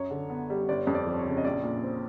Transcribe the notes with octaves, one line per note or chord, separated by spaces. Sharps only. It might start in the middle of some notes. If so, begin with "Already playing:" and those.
Already playing: F#2 C#5
D3
B3
G3
G1 D5
F2
D5
F3
C#5
C#3
D#5
A#1 D5
A#2
C4